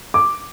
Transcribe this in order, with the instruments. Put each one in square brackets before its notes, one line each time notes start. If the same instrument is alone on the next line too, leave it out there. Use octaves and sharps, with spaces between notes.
[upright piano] D6